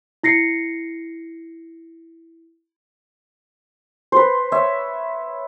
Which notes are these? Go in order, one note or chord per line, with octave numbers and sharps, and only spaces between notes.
E4 A#6 C7 C#7
B4 C5
C#5 E5